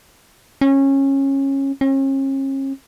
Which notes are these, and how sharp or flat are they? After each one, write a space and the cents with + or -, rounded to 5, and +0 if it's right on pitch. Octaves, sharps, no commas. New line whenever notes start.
C#4 -20
C#4 -40